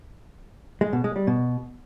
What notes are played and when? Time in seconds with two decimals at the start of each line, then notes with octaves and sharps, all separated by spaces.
0.81 G#3
0.93 B2
1.04 G#3
1.16 G3
1.27 B2